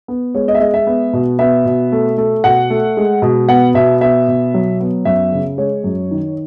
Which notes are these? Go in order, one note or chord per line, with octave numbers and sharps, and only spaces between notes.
B3
G#3 C#5
D#5
E5
G#3 D#5
E5
B3
B2
B3 E5
B2
A3
A3
B2 F#5
A3
G#3
B2
B3 F#5
B2 E5
B3 E5
B2
F#3
B3
F#2 E5
C#3
G#3 C#5
F#2
D#3